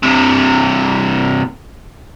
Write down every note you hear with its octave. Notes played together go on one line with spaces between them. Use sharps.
G2 C3